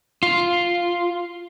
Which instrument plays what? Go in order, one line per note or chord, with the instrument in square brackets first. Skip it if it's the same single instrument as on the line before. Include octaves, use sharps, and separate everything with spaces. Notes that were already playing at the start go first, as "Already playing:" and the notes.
[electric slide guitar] F4